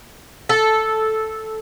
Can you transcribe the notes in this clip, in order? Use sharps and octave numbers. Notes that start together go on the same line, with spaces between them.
A4